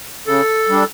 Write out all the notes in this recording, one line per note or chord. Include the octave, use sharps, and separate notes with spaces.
C#3 A4
G3 D4